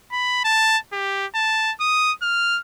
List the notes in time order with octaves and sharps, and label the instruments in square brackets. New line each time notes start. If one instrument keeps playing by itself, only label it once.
[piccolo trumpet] B5
A5
G4
A5
D#6
F6